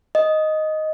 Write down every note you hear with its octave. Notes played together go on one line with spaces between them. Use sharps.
D#5